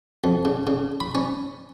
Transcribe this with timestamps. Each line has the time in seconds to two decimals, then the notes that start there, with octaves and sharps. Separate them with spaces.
0.24 F2
0.45 C#3
0.67 C#3
1.00 B5
1.15 C#4